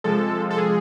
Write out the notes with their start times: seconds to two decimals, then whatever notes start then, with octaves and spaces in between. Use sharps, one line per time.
0.04 C3 F3 G#3 A4
0.51 A4
0.58 G#4